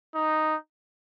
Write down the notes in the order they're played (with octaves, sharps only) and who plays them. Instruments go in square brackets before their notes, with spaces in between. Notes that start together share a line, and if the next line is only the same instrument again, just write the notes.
[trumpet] D#4